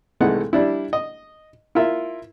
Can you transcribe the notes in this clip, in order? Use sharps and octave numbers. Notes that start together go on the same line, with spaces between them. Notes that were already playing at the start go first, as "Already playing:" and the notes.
C2 E3 G#3 A3 D#4 F#5
G3 D4 E4
D#5
E4 F4 A#4 E5